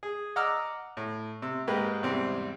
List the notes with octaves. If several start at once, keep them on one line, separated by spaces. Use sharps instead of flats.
G#4
D#5 F#5 A#5 D6 E6 F6
A2
C3 E6
G#2 G#3 A#3 G4 B4
E2 G#2 C3 G3 C4